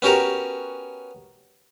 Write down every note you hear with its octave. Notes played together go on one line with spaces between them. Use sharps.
B3 C#4 F#4 G4 A#4